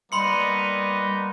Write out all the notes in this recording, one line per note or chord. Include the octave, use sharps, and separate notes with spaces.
G3 A#3 B3 D#4 B5 C6 C#7